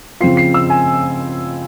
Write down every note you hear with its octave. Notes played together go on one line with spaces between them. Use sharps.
C#3 F3 C4 F4 C7
C7
E6
G#5